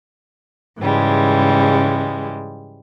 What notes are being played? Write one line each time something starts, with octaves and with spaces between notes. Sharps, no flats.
G#2 C#3 E3 G3 G#3